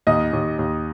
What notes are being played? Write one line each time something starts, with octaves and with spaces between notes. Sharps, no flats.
D#2 D#5
D#2
D#2